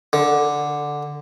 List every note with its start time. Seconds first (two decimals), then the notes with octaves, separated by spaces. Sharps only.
0.13 D3